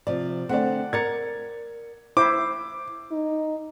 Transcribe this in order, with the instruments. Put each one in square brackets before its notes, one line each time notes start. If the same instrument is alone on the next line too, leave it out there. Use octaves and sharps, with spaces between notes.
[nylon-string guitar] C3 F3 [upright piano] D5
[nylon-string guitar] D3 A3 C4 [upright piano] D5 F#5
[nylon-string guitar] A#4 D5 [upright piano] G#6 A6 C#7
[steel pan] E4 C5 [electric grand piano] D6
[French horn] D#4